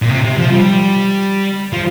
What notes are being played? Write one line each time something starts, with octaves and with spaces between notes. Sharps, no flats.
A#2
C3
C3
F3
G3
F3